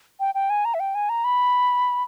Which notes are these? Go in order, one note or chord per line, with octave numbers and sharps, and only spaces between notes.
G5
G5
G#5
A#5
E5
G5
G#5
A#5
B5